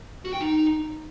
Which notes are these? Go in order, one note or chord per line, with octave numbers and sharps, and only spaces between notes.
F#4
G5
D#4